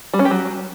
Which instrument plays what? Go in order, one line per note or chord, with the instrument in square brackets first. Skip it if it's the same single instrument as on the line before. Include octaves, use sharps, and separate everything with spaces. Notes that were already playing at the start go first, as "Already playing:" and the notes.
[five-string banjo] G3
C#4
G4
F#3